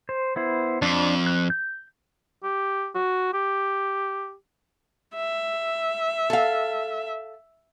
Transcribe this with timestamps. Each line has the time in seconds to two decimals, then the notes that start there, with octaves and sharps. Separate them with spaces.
0.09 C5
0.36 B3 E4 C5
0.82 F2 D4 D6
1.27 F#6
1.50 G6
2.44 G4
2.95 F#4
3.34 G4
5.16 E5
6.30 A4 F5